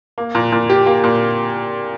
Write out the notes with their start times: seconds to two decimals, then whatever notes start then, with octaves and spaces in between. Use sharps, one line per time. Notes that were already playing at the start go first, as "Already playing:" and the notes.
0.18 A#3
0.35 A#2
0.52 A#2
0.70 G4
0.86 A#3
1.04 A#2